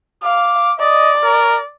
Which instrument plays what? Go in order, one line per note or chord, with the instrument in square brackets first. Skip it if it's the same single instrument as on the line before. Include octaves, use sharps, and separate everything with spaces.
[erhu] F5 [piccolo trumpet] D6
[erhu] D5 [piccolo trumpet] D#5
[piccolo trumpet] A#4